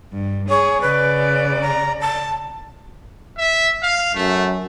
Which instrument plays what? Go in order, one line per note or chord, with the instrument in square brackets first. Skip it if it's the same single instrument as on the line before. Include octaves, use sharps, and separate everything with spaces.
[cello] G2
[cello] G#4 [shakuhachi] C#5
[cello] C#3 D5 [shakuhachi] B4
[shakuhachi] A#5
A5
[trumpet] E5
F5
[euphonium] F#2 [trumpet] A3